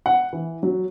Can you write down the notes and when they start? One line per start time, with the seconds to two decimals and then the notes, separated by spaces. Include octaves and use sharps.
0.06 F#5
0.33 E3
0.63 F#3